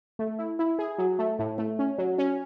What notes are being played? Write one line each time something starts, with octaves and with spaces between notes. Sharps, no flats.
A3
E4
E4
G#4
F#3
A3
A2
A3
C#4
F#3
C#4